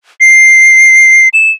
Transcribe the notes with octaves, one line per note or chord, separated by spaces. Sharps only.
C7
E7